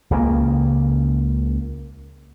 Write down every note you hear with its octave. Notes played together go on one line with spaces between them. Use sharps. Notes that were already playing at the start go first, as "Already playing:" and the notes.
C#2 C#3 F3 A#3